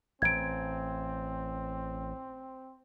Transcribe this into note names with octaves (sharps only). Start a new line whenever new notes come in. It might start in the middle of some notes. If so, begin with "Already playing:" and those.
A1 C4 G#6 D7